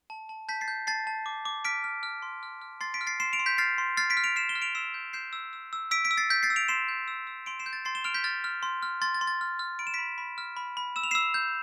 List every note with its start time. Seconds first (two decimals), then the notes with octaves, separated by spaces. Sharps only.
0.10 A5
0.29 A5
0.49 A5 G6 B6
0.61 A6 C7
0.68 G6
0.87 A5 A6 C7
1.07 A5
1.26 D6
1.45 D6
1.65 F6 B6 D7
1.84 F6
2.03 F6
2.22 C6
2.43 F6
2.62 F6
2.81 C6 A6 C7
2.94 B6 D7
3.01 F6
3.07 A6 C7
3.20 C6 C7 E7
3.33 D7 F7
3.39 C6
3.46 G6 B6
3.58 F6 A6 C7
3.78 C6
3.97 F6 A6 C7
4.10 B6 D7
4.17 F6
4.24 D7 F7
4.36 F6 C7 E7
4.49 E7 G7
4.56 F6
4.62 D7 F7
4.75 E6 C7 E7
4.94 G6
5.13 G6 C7 E7
5.33 E6
5.53 E6
5.73 E6
5.91 E6 B6 D7
6.05 B6 D7
6.11 E6
6.17 A6 C7
6.30 G6 B6
6.43 A6 C7
6.50 E6
6.56 D7 F7
6.68 C6 C7 E7
6.88 G6
7.08 E6
7.27 E6
7.46 C6 D7 F7
7.59 C7 E7
7.66 G6
7.73 A6
7.85 C6 A6 C7
7.95 E7 G7
8.04 F6 D7 F7
8.14 G6 B6
8.24 F6 A6
8.44 F6
8.63 C6
8.83 F6
9.02 C6 A6
9.14 A6
9.21 C6
9.27 A6
9.41 F6
9.59 F6
9.79 B5 D7
9.87 E7
9.94 B5 B6 D7
10.18 B5
10.38 F6
10.57 B5
10.77 B5
10.96 E6 E7
11.04 F7
11.11 E6 C7 E7
11.34 G6